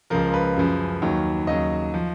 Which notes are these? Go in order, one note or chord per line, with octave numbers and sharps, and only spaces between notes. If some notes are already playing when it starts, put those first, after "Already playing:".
C#2 C#3 F3 A#4
B4
F#2 C#3 F3
D#2 D#3 F#3
D#2 C#3 F#3 D#5
F3